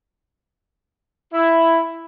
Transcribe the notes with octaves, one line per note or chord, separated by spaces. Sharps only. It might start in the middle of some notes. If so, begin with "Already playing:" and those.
E4